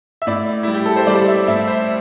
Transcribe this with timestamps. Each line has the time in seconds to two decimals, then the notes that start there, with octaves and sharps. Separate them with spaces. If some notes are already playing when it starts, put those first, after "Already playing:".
0.22 E5
0.27 A2 D5
0.63 G3 E4
0.74 G4
0.86 A4
0.96 C5
1.07 G3 D5
1.28 E5
1.48 A2 E5
1.67 C5